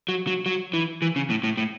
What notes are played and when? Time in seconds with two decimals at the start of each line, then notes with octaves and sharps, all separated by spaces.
0.09 F#3
0.27 F#3
0.46 F#3
0.74 E3
1.02 E3
1.16 C#3
1.30 A2
1.44 A2
1.57 A2